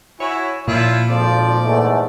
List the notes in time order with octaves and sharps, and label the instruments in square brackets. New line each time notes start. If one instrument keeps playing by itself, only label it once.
[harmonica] E4 F#4 G#5 [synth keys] C#5
[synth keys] A#2 [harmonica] F3 E4 F4
[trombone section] G#1 F2 F3 [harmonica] D5
[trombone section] E2 G#2 A3